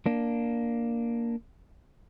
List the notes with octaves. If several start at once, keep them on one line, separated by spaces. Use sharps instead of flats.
A#3 D4